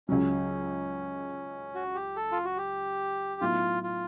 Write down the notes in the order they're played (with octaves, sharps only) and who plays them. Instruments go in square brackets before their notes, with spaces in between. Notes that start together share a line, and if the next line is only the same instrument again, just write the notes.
[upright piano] C#2 C#3 F#3 [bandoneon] C#4
[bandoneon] F#4
G4
A4
F4
F#4
G4
[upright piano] A2 F#3 B3 D#4 [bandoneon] F4
[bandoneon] F4